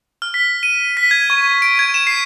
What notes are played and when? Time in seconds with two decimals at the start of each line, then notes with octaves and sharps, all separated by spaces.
0.22 F6
0.34 B6
0.63 D#7
0.97 B6
1.11 G#6
1.30 C#6
1.62 D7
1.79 G#6
1.94 E7
2.07 C7